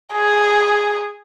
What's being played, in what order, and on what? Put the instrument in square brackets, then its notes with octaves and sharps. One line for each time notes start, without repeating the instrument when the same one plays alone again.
[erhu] G#4